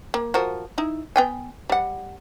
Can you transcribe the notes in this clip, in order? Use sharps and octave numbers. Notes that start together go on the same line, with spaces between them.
A#3
F3 F#4 A#4
D#4 E4
B3 G5 G#5
G3 F#5